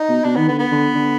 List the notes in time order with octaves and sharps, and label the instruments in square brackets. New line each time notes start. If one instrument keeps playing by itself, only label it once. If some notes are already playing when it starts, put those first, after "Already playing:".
Already playing: [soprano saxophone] D#4
[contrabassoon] B2
[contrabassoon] B2 [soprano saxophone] D4
[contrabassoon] D#3 [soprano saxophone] B3
[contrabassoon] D3 [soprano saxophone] B3
[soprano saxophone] B3
[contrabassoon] D3
D3